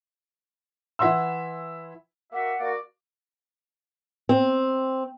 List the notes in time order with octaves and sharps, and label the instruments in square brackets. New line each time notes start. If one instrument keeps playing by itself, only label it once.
[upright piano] E3 E4 E5 F#5 C6 E6
[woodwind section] A#3 F#4 E5 [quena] F#5
[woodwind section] A#3 F#4 D5
[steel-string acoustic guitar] C4